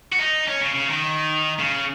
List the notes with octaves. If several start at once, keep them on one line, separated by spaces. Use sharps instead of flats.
F#4
D#4
C#4
C#3
C#3
D#3
C#3